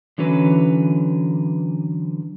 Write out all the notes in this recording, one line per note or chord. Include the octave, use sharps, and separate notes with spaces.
D3 E3 F#3 C#4 B4